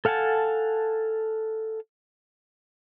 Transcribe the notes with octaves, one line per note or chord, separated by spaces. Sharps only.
A4 F5 F#5 G#5 A5